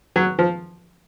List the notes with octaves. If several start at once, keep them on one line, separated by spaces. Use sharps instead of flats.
F#3
F3